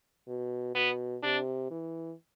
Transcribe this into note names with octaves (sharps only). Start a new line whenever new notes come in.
B2
B2 B3
C3 D4
E3